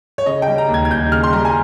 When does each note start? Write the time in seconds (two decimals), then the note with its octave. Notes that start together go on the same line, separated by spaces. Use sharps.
0.18 C#5
0.26 C#3 D#5
0.42 G5
0.48 G3
0.58 A#5
0.68 D#2
0.74 G#6
0.85 G#6
0.90 D#2 G6
1.12 C#3 F6
1.23 C6
1.33 G3 A#5
1.45 G#5